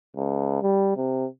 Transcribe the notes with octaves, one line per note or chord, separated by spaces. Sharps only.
C#2
G3
C3